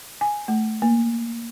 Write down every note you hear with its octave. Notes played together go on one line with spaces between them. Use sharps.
G#5
A3
A#3